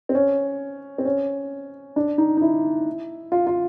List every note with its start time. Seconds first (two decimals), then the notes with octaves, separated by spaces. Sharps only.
0.09 C4
0.15 C#4
0.98 C4
1.05 C#4
1.96 D4
2.18 D#4
2.37 D#4
2.42 E4
3.32 F4
3.47 F4